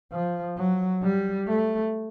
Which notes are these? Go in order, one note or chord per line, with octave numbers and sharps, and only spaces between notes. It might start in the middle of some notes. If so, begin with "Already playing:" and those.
F3
F#3
G3
A3